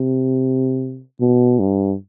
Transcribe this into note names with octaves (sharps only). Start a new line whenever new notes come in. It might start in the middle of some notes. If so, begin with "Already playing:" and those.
Already playing: C3
B2
G2